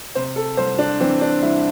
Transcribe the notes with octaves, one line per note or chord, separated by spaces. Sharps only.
C3 C5
A4
C2 C5
D4
E3 C4
D4
C2 E4